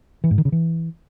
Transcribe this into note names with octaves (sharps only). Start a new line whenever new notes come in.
E3
G#2
D#3
C#3
E3